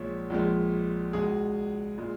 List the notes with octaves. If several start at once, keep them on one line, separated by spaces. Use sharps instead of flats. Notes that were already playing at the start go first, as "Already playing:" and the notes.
Already playing: A#1 A#2 G#3 C#5
A#1 A#2 G#3
C#2 B2 G#3 G#4
A#2 G#3